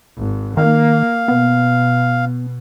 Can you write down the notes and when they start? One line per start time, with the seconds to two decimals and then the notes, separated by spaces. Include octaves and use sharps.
0.17 G#1
0.57 D#3 A#3 F5
1.28 B2 B3